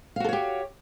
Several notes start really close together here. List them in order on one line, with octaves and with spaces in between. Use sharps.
F5 F#4 A4 C#5 G4